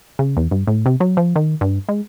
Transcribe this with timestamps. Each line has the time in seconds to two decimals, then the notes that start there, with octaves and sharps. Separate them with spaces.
0.19 C#3
0.37 E2
0.51 G2
0.67 A2
0.86 C3
1.00 F#3
1.17 F3
1.36 D#3
1.61 G2
1.89 G#3